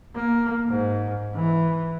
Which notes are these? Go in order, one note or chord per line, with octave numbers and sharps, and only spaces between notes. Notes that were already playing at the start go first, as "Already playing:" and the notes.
A#3
G#2
E3